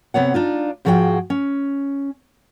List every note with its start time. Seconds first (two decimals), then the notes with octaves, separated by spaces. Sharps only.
0.14 C3 B3 C#5 F#5
0.34 D4 D#4 F4
0.85 G#2 F3 F#4 G#4 C5 G5
1.30 C#4